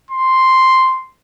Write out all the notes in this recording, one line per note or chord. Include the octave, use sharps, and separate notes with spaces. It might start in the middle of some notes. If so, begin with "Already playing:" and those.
C6